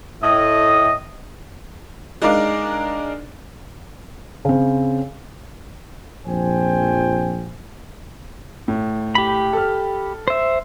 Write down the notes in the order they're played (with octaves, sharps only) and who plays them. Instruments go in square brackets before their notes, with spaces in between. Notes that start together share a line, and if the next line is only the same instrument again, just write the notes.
[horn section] A2 D#5
[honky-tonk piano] G#3 D4 D#4 A#4 D5 F5
[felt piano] C#3 C4
[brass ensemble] A#1 F2 C5 G5 G#5
[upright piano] A2
[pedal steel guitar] G4 B5
[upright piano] A4 F6
[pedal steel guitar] C5 E5